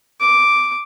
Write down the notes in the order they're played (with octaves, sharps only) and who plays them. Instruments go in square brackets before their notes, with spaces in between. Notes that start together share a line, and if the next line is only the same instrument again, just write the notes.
[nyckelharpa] D6